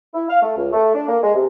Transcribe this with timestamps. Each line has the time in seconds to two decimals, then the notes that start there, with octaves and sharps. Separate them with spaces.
0.14 E4
0.30 F5
0.42 A3
0.57 C#2
0.73 A3
0.95 D4
1.08 A#3
1.23 G#3
1.35 C3